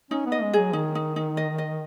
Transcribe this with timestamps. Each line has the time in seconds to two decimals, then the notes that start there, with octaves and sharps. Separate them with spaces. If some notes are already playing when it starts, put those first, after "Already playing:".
0.11 C#4 D#4
0.26 B3
0.32 D#5
0.42 G#3
0.53 F#3 G#4
0.73 D#3 D#4
0.95 D#4
1.16 D#4
1.37 D#5
1.58 D#5